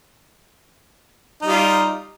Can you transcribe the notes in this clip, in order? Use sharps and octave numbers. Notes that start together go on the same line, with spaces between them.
G3 D#4 F4